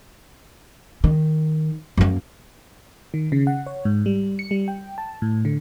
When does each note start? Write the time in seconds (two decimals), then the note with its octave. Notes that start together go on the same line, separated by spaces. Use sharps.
1.04 D#3
1.97 F#2 A#3
3.14 D#3
3.32 C#3
3.47 F#5
3.66 C#5
3.85 G#2
4.06 G3
4.39 C#7
4.51 G3
4.68 G5
4.98 A5
5.22 A2
5.45 D3